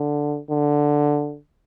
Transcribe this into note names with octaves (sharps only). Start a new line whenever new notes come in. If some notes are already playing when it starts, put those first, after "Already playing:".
Already playing: D3
D3